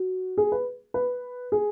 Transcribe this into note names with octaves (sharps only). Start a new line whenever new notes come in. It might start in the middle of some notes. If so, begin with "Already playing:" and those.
Already playing: F#4
G#4
B4
B4
G#4